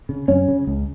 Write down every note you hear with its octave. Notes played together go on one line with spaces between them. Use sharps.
C#3
F#2 C#4
C#3
C#2